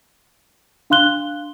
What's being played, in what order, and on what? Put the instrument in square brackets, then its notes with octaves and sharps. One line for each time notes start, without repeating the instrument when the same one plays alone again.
[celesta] D4 F5 C6 F#6 G7